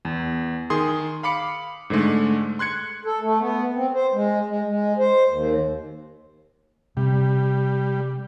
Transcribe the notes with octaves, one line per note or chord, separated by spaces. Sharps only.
E2
D#3 G#4 C6 D#6
F5 B5 D6 C#7
G#2 D3 G#3 A3
C6 F#6 G#6 C#7
A4
A3
B3
C4
C5
G#3
G#3
G#3
C5
D#2
C3 G3